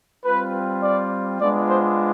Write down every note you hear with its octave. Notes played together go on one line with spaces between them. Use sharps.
G3 C4 F4 B4
D5
G#3 B3 D4 F4 D5
C5